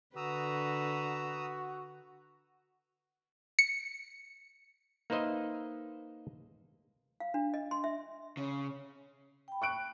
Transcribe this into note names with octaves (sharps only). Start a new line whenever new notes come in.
D3 F#4 B4 A#5 D#6 E6
C#7
A#3 D#4 B4 C5 D#5 E5
F5
D4
D#5
C6
E5
C#3
G5 B5
C#6 F#6 D7